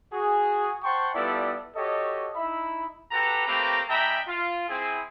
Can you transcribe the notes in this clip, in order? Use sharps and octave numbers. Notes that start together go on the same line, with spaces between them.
F#4 G#4
C5 F#5 G5 A5 C6 C#6
G3 B3 E4 F4 A4 D5
F#4 G4 A4 C#5 D#5
D#4 E4 E5 B5
F#4 G4 A4 B4 A#5
A3 A#3 C4 G4 B4 A#5
G#3 D4 E5 G5 A#5 B5
F4
C4 E4 G#4